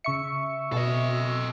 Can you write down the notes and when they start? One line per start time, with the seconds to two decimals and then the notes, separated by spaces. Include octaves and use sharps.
0.04 C#3 E5 C#6 C#7
0.72 B2 A4 D#5